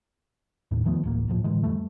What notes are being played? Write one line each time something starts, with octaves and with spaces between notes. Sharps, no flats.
F1 D#2 A2
D#3 F3 A3 B3
D1 A1 A#3
D1 A2 F3
A2 D3 E3 G#3
F2 G3 A3